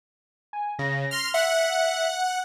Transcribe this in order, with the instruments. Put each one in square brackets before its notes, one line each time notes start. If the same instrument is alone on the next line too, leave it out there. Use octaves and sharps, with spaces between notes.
[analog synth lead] G#5
[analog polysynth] C#3 [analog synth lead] A#6
[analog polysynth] C6 F6
[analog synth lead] E5 [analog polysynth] F#5